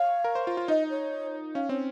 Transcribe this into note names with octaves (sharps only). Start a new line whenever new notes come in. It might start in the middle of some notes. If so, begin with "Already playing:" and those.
Already playing: C#5 F5
A#4
C5
F4
F4
D#4 D#5
C#5
C#4 F5
C4 C#5